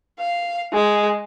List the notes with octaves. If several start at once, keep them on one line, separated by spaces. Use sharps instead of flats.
F5
G#3